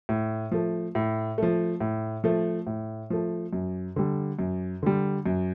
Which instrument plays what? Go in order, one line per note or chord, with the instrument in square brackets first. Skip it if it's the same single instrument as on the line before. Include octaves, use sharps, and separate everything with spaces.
[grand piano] A2
F3 A3
A2
F3 A3
A2
F3 A3
A2
F3 A3
F#2
D3 G3
F#2
D3 G3
F#2